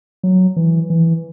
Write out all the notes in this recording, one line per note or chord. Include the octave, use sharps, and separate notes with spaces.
F#3
E3
E3